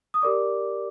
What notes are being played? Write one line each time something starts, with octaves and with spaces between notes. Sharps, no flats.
D#6
G4 A#4 D5 D6